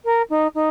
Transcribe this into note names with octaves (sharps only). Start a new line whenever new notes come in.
A#4
D#4
D#4